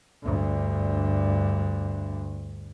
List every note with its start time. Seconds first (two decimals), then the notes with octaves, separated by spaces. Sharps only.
0.23 D2 G2